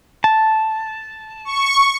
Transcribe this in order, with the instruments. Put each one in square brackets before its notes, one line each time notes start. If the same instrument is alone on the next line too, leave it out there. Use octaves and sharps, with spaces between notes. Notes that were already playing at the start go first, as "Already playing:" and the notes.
[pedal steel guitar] A5
[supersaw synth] C#6